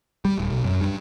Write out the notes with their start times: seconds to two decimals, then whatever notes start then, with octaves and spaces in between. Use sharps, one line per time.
0.25 G3
0.38 D1
0.52 B1
0.65 F#2
0.81 G2